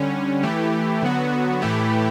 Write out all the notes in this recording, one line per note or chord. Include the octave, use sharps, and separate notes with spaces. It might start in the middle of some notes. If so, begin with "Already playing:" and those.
Already playing: D3 G3 C#4
E3 A3 E4 G4
D3 F#3 B3 F#4
A2 E3 A3 E4 G4